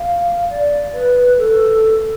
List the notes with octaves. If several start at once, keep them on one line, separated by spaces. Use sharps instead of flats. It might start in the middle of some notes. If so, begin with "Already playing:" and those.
Already playing: F5
D5
B4
A4